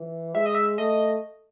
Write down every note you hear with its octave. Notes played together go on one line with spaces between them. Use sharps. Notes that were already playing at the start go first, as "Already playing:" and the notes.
Already playing: E3
G#3 E5
D#5
E5
A3 D#5